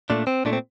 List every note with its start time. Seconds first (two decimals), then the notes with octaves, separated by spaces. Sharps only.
0.10 A#2 A3 D4
0.27 C4
0.45 A#2 A3 D4
0.53 C4